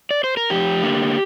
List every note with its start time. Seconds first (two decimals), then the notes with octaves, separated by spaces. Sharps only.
0.11 D5
0.24 C5
0.37 A#4
0.50 F2 G4
0.83 D3 A#3